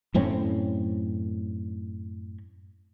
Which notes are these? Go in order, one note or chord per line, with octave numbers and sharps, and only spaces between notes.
F#2 A2 C4 C#4